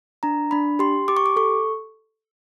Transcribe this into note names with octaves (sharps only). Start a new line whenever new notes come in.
D4 A#5
D4 B5
G4 C6
G4 D6
C#6
D6
A4 C#6